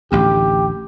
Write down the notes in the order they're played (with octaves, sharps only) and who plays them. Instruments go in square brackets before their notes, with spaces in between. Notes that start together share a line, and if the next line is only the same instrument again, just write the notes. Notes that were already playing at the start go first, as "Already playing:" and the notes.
[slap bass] A1 D2 [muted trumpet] G4